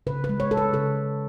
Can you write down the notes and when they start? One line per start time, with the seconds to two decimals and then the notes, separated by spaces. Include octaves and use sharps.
0.07 C#3 B4
0.24 B4
0.29 G#3
0.40 C#5
0.51 G#3 A4
0.57 B4
0.73 C#3 A4